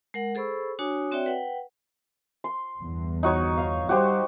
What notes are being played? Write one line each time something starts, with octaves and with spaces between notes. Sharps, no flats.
G#3 A#4 F#5
G#4 A4 C5 B5 C#6 E6
D4 F#4 C#5 G#5 D6 D#6
C4 F#4 C#5 D5 E5 G5
B4 F#5 G5
C6
G1 E2
D#4 F#4 C#5
F5
G3 F#4 G4 C5